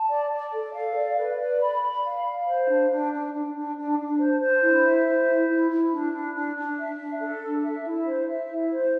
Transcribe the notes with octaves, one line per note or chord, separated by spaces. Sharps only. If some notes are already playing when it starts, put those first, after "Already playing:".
Already playing: A5
D5
D5
A4
F5
D5
B4
D5
B5
B5
F5
F5
C5
D4
D4
D4
D4
D4
D4
D4
C5
C5
E4
E5
C5
E4
E4
E4
D4
D4
D4
D4
E5
D4
A4
D4
E5
E4
C5
E5
E4
C5